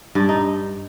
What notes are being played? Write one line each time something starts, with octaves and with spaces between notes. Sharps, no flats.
G2 D4
D#4